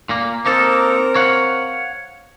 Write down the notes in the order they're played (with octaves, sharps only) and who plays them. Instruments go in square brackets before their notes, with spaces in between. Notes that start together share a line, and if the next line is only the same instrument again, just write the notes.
[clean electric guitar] A#2 A#3
[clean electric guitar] A#3 D#4 A4 [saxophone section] C4 A#4
[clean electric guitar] C#5 F5 F#5